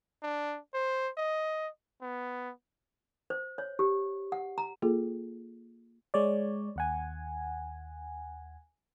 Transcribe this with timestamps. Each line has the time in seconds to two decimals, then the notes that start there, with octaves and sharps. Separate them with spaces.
0.22 D4
0.74 C5
1.17 D#5
2.02 B3
3.30 C5
3.58 C#5
3.79 G4
4.32 F#5
4.58 A#5
4.82 A#3 F4 G#4 A4
6.14 G#3 C#5 D5
6.76 D#2 F#5 G#5